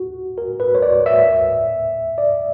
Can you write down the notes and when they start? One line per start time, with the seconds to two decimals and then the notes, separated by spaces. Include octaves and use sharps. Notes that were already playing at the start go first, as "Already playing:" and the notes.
Already playing: F#4
0.38 A#4
0.60 B4
0.75 C#5
0.82 D5
1.06 E5
2.18 D5